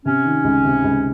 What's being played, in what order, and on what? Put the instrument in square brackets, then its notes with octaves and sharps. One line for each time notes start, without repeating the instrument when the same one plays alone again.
[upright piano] C3 [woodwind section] C#4
[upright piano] D#3
C#2
C3
C#2